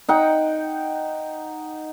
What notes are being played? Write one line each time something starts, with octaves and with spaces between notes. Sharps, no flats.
D#4 F#5 G5